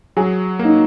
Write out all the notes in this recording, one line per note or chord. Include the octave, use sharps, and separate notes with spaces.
F#3 G#4
A#3
D#4